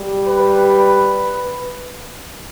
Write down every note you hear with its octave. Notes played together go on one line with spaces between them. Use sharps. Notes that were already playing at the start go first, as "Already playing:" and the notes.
Already playing: G3
B4